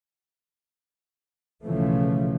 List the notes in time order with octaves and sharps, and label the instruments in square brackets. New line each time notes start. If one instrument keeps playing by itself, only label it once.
[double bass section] B1 C#3 E3 F3 A3